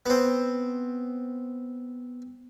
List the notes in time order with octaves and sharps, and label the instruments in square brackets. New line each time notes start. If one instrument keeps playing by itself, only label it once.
[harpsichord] B3 C4